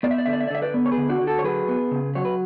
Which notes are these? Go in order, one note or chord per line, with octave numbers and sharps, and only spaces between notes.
B3 D5
E5
D5
D3 E5
D5
E5
D5
D3 E5
B4 D5
B3
C#5
G#4 B4
D3
D4 F#4
D3
F#4 A4
C#5
F#3 G#4 B4
B3
C#3
F#3 C#5
B4